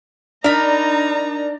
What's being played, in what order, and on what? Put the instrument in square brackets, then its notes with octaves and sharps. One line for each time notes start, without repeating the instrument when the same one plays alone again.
[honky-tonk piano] D4 [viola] D#4 A#5 [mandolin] A#4 B5